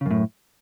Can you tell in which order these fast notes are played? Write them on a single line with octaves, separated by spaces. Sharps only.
C#3 F#2 A2